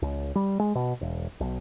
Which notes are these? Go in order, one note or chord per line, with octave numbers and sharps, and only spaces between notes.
C#2
G3
G#3
B2
E1
B1